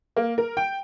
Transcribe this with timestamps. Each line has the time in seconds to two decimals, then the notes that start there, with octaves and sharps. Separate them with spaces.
0.16 A#3
0.38 A#4
0.57 G5